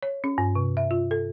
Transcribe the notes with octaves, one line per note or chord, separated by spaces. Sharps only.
C#5
C#4
G2
C3
E5
F4
A4